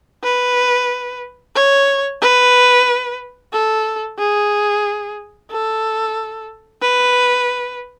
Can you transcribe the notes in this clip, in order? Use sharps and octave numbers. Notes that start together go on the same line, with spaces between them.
B4
C#5
B4
A4
G#4
A4
B4